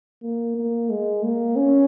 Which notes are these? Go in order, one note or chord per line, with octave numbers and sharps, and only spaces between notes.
A#3
A#3
G#3
A#3
C#4